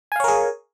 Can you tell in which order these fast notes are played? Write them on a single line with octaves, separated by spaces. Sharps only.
G#5 F5 C#5 A#4 G#4